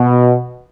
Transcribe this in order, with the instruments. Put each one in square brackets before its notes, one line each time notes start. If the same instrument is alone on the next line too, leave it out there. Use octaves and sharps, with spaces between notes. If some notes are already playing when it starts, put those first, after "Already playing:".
Already playing: [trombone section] B2